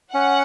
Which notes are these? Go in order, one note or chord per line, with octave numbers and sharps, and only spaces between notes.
C#4 F#5